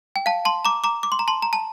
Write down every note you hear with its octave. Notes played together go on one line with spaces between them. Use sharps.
G5
F5 A5
A5 C6
A#5 D6
A#5 D6
D6
C6
A#5
A5 C6
A#5
A5